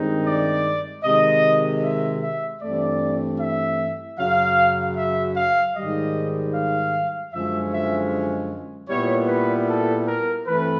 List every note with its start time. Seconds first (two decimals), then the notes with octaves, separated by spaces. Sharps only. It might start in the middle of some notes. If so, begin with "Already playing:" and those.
Already playing: G2 D#3 G#3 C4 D#4
0.25 D5
1.04 C3 D#3 G#3 D#5
1.83 E5
2.21 E5
2.61 G2 E3 A3 C4 D5
3.39 E5
4.17 F#2 C#3 F#3 F5
4.97 E5
5.36 F5
5.75 G#2 D#3 G3 D#5
6.54 F5
7.32 F#2 D3 F3 G#3 C#4 E5
7.72 E5
8.89 A#2 G3 B3 E4 C#5
9.28 B4
9.67 A4
10.06 A#4
10.46 G2 E3 A3 C4 B4